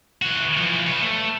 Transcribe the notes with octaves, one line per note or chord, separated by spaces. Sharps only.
E3 F#4
E3 F3
B4 C#5
A3